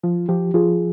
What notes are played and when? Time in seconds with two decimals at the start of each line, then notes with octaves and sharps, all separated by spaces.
0.03 F3 F4
0.28 F3 G4
0.54 F3 F4 G#4